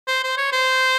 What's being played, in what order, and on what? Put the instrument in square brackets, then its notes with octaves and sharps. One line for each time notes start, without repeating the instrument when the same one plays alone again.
[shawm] C5
C5
C#5
C5